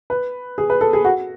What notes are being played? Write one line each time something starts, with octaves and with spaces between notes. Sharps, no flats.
B4
G#4
B4
A4
G#4
F#4